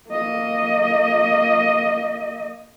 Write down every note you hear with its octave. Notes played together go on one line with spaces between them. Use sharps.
A#3 D#5